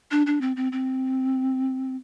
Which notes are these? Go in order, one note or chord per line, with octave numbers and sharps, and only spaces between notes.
D4
D4
C4
C4
C4